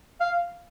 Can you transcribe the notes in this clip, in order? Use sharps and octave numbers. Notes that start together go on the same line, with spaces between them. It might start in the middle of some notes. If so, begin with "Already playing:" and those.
F5